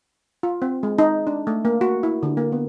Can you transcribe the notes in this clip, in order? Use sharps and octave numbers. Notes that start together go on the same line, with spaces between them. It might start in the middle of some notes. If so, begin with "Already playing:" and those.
F4
C4
G#3
D#4
D4
A3
A#3
F#4
E4
D3
A#3
B3